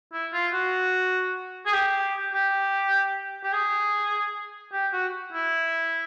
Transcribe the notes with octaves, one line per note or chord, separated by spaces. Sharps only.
E4
F4
F#4
G#4
G4
G4
G4
G#4
G4
F#4
E4